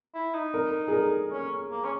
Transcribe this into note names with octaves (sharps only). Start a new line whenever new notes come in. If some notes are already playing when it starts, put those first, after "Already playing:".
E4
D#4
A#4
G#4
A#4
C#4
A#3
C#4